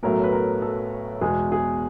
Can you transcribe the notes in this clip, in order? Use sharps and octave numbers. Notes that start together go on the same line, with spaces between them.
B1 A2 F#3 A3 A#4
B4
A#4
A4
E2 B2 G#3 G#4
G#4